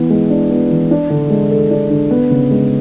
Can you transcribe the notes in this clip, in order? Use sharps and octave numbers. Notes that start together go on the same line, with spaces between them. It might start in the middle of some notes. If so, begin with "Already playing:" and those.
Already playing: E3 B3
G#3
D4
B3
E3
D4
D3
G#3
A4
D4
D3
B3
C#3
G#3